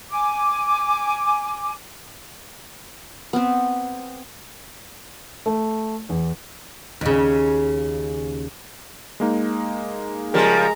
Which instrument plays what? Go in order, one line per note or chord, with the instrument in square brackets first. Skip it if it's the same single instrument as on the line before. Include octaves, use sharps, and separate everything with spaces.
[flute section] G#5 D6
[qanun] B3 C4
[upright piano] A3
E2
[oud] D#2 C#3
[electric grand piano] G#3 A#3 D#4
[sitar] C#3 F3 G3 [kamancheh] G#3 A#5 [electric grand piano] G4 A#4